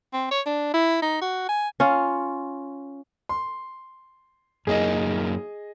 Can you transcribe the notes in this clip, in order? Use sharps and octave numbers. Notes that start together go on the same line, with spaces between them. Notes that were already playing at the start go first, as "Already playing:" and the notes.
C4
C#5
D4
E4
D#4
F#4
G#5
C#4 F4
C6
F#2 A#3 D#4 G#4 D#5